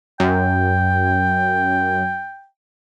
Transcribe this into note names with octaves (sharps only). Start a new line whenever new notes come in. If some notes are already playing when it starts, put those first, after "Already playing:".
F#2 G5